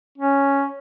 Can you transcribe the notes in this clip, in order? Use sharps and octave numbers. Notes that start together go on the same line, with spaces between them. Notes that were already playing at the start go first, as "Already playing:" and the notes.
C#4